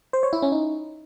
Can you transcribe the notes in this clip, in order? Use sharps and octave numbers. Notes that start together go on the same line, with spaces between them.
C5
C#5
E4
C#4
D#4